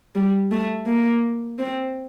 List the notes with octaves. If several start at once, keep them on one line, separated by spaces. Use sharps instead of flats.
G3
A3
A#3
C4